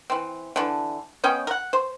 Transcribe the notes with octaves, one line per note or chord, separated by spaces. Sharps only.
E3 C4
D3 E3
B3 C#4 D#5 G5
A#4 F#5
C5